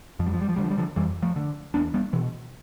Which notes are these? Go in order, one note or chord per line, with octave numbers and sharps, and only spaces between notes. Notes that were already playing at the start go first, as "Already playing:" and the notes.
F2 F3
G3
F3
G3
F3
D3 G3
F3
G3
D3 F3
F2 E3 G3
F3 A3
D3
E2 B3 D4
G3 B3
B2 E3